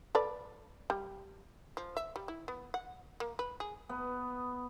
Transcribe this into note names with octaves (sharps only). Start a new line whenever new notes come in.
A4 B4 D5
G3
F3
E5
G3
E4
B3
F#5
A#3
B4
G#4
B3